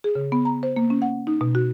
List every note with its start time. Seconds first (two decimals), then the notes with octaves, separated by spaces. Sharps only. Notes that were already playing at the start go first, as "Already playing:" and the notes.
0.04 G#4
0.15 C#3
0.32 B3
0.45 A#5
0.63 C5
0.76 A#3
0.90 C#4
1.02 F#5
1.27 D#4
1.41 B2
1.55 F#4